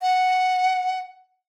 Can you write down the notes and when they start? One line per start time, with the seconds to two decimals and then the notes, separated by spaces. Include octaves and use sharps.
0.02 F#5